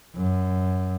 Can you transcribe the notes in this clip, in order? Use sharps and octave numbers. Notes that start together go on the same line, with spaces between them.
F#2